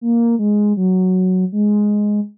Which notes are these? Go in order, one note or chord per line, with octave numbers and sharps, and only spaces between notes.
A#3
G#3
F#3
G#3